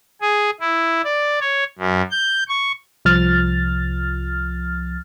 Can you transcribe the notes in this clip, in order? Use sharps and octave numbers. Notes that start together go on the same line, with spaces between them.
G#4
E4
D5
C#5
F#2
G6
C#6
C2 F3 F6 A6